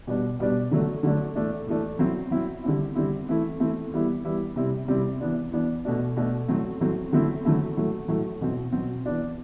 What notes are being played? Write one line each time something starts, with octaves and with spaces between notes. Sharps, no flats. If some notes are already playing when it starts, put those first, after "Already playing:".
B2 G3 B3 D4
B2 G3 B3 D4
D3 F#3 A3 D4
D3 F#3 A3 D4
A2 E3 A3 D4
A2 E3 A3 D4
F#3 C4 E4
F#3 C4 E4
D3 G3 C4 E4
D3 G3 C4 E4
E3 A3 C4 E4
E3 A3 C4 E4
E3 G3 B3 E4
E3 G3 B3 E4
C3 G3 C4 E4
C3 G3 C4 E4
E3 B3 D4
E3 B3 D4
B2 A3 D4
B2 A3 D4
A2 F#3 A3 C4
A2 F#3 A3 C4
D3 F#3 A3 C4 E4
D3 F#3 A3 C4 E4
A2 F#3 A3
A2 F#3 A3
B2 F#3 C4
B2 F#3 C4
E3 B3 D4